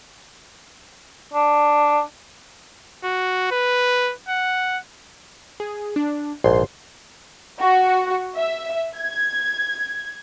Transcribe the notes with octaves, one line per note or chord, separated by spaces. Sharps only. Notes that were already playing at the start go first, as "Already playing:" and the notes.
D4
F#4
B4
F#5
G#4
D4
A#1 G#2 C6
F#4
E5
G#6